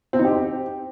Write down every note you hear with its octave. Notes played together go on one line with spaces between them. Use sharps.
C4
D#4
G4